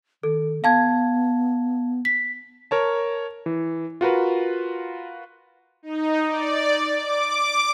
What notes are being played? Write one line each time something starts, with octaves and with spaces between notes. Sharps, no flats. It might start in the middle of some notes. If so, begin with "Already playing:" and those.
D#3 A4
B3 F5 A5 G#6
B6
A#4 C#5 A5
E3
F4 F#4 A#4 B4
D#4
D5
D6